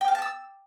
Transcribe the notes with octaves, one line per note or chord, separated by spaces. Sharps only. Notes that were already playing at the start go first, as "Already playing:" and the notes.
G5
F5
A5
E6